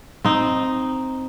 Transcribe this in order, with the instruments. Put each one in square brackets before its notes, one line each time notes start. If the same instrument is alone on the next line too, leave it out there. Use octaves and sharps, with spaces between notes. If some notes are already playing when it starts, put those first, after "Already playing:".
[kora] C4 D#4